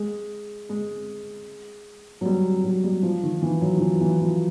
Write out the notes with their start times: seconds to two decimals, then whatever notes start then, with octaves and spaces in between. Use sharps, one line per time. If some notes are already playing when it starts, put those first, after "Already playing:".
Already playing: G#3
0.69 G#3
2.21 F#3
2.25 G3
2.64 F#3
2.84 G3
3.03 F3
3.23 D#3
3.42 E3
3.61 F#3
3.77 F3
3.81 E3
4.01 E3
4.21 F3